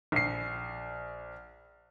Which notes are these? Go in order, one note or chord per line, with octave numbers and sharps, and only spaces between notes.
A#1 C7